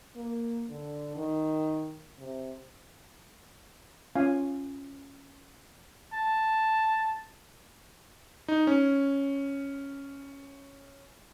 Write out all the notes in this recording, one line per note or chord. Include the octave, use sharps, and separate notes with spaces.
A#3
D3
D#3
C3
C#4 F4 F5 G#5
A5
D#4
C#4